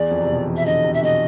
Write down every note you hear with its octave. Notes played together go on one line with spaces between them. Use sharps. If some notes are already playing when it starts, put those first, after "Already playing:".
Already playing: E2 D5
F2
C3
B2
E3
E5
D3 D#5
C3
E5
B2 D#5